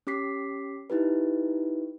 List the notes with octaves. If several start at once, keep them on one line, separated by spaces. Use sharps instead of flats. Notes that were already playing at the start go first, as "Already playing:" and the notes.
C#4 G4 D6 B6 C7
D#4 E4 G4 B4